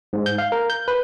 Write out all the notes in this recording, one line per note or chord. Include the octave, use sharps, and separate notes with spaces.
G#2
G6
F5
A#4
G6
B4